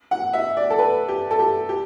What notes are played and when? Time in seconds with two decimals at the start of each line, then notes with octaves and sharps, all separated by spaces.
0.11 F#5
0.33 E5
0.57 D5
0.70 A4
0.79 B4
1.08 G4
1.31 A4
1.39 G4
1.69 G4